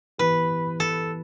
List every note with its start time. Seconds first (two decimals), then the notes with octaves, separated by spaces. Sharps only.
0.19 E3 B3 E4 G4 B4
0.80 A4